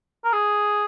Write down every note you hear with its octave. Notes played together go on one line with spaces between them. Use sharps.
A#4
G#4